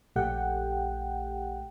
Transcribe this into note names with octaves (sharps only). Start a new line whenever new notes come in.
A#1 A3 G4 F#5 G5